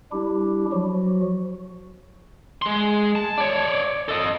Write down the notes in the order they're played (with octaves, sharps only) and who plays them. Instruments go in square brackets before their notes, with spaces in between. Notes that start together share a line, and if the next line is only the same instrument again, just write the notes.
[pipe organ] G3 D4 E4 G4
F3 F#3 F#4
[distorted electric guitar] G#3 C6
A5
C#5 D5
A4 D#5